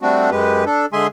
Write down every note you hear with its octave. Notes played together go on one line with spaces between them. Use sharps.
G3 A3 C4 D4 F#4
F#2 G#3 G4 B4
D4 A4
D3 G#3 G#4 E5 G#5 C6